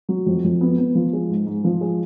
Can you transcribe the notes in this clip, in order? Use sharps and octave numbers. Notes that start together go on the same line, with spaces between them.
F#3
F2
F2
B3
B3
F3
G#3
G#2
G#2
F3
G#3